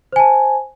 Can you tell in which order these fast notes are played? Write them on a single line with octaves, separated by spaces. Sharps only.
C5 G#5 A5